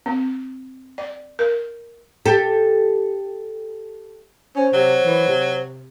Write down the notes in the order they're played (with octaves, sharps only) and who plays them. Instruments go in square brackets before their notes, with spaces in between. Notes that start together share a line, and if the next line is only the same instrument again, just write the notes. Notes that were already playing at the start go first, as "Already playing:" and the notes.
[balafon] C4
D5
A#4
[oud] G4 A4
[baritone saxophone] C#4 [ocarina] C5
[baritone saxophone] C3 [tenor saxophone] F#3
[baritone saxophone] E3
C3